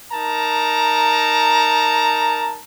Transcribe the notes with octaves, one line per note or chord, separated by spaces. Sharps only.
D#4 A#4 A5 A#5